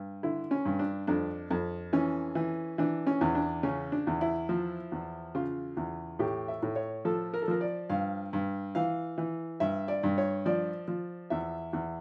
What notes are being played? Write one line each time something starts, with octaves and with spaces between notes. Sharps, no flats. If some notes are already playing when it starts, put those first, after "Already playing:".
Already playing: G2
D3 E4
C#4
G2
D4
F2 D4
F2
E3 C#4
E3
E3 D4
C#4
E2
D4
C#3 C#4
D4
E2
E4
F3
E2
C#3 F4
E2
A2 G4
E5
A2
C#5
F3 A4
A#4
A4
F3 A#4
D5
G2 F5
G2
E3 F5
E3
G2 E5
D5
G2
C#5
F3 D5
F3
E2 E5
E2